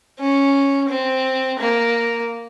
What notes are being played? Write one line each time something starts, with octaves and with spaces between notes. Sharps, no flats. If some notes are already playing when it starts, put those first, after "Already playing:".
C#4
C4
A#3